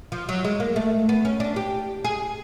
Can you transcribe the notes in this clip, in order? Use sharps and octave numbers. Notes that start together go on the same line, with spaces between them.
F3
F#3
G#3
A#3
A3
B3
C#4
D4
G4
G#4